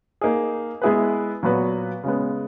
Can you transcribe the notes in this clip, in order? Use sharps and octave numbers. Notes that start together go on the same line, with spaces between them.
A#3 D#4 G#4
G#3 B3 E4 G#4 B4
A#2 F#3 B3 F#4 B4
C#3 G#3 B3